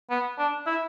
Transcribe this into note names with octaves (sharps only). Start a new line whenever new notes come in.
B3
D4
E4